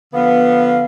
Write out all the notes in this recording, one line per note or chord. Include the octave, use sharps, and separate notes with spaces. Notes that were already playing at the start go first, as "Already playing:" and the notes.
D3 F3 B3 F5